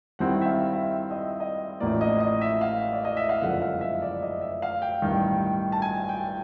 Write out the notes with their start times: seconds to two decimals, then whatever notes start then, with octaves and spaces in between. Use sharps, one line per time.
0.19 G2 D#3 G3 C4 E4 F#5
0.41 E5
0.46 F5
0.73 E5
1.11 D#5
1.20 E5
1.40 D#5
1.80 A1 A2 F3 A#3 D#4 D5
2.01 D#5
2.20 D#5
2.41 E5
2.61 F5
2.93 D5
3.05 D#5
3.17 E5
3.29 F5
3.42 F#1 F2 D3 F3 G#3 F#5
3.62 F5
3.81 E5
4.02 D5
4.22 D#5
4.41 E5
4.62 F5
4.82 G5
5.02 A1 G2 D#3
5.72 A5
5.82 G#5
6.09 G5